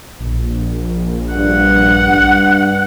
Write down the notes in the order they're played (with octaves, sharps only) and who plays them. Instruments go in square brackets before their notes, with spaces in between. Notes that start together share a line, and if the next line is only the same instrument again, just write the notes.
[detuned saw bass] A#1
[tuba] G2 [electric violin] F#5
[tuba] G2